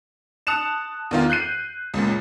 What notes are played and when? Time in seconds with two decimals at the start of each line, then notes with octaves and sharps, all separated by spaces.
0.47 A5 D#6 F#6 C#7 E7 F7
1.11 E2 D#3 F4
1.30 F#6 G6 C7 D#7
1.94 C#2 A#2